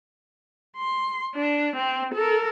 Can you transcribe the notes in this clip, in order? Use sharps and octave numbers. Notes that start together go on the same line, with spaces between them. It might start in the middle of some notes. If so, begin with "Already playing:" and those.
C6
D4
C4
A4 A#4